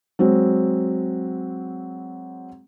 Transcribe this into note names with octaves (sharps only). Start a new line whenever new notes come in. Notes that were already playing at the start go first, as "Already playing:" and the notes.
F#3 G#3 C4